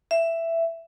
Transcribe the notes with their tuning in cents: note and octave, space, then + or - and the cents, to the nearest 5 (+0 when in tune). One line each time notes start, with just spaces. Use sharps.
E5 +10